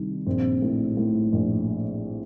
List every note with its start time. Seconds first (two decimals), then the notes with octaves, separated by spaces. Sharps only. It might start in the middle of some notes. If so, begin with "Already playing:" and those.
Already playing: C2 D#3 G3
0.26 A#1 C4
0.62 A2
0.97 A2
1.33 A#1